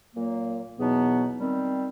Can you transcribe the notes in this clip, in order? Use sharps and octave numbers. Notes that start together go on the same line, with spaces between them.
A#2 F#3 A#3
E2 B2 F#3 B3 D#4
D#3 G3 C4